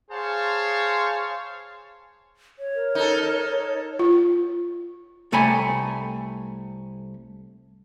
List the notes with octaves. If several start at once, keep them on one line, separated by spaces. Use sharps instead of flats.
G#4 C5 C#5 F5 A5
C#5
A#4
D#4 A4
F4
C2 A3 G5 G#5 B5